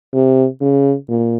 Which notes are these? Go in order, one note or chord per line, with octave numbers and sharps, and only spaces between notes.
C3
C#3
A#2